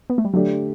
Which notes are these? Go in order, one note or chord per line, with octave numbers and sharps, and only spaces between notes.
B3
A3
G3
D3 F#3 A3 D4 G4